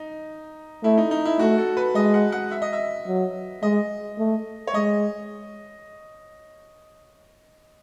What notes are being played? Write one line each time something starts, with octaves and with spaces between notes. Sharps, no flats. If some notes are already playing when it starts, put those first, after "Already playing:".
Already playing: D#4
A3 E4
D#4
D#4
E4
A3 F#4
A4
B4
G#3 D#5
F#5
F#5
E5
D#5
E5
F#3
G#3 D#5
A3
C#5
G#3 D#5